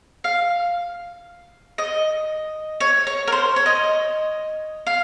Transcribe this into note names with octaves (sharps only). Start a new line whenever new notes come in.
F5
D#5
C#5
C#5
A#4
C5
C#5
D#5
F5